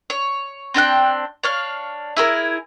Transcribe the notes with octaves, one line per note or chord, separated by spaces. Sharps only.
C#5
C4 D4 G5 F#6
D4 C#5 F5
E4 G#4 A#4